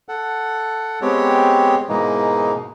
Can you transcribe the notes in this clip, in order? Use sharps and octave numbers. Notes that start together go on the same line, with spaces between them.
A4 F#5
G#3 B3 C4 G4 C#5
G#2 B2 E3 G#3 A#3 D#4